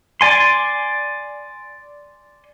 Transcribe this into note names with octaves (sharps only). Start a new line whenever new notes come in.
D5 G#5 C6